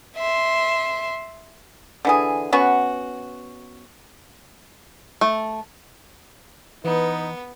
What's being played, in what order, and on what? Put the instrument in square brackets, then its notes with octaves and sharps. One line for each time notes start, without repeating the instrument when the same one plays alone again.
[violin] E5 C6
[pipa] D3 E3 G#4
B3 C#4 F#4
[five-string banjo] A3
[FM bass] E3 [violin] B3 [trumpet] D#4 [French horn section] B4